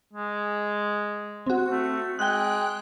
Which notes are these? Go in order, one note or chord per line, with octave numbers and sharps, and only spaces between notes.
G#3
C4 F#4
A3
G#3 G5 F#6